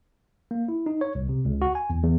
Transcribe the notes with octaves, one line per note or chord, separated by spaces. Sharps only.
A#3
E4
D#4
C#5
C2
C3
C#2
F#4
G#5
E2
E2